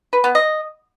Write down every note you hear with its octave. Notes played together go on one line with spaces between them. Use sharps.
B4
B3
D#5